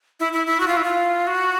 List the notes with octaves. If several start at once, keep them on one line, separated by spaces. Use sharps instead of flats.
E4
E4
E4
F#4
F4
E4
F4
F#4